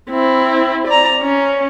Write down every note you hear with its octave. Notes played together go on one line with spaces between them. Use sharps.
C4 E4
D5 A#5
C#4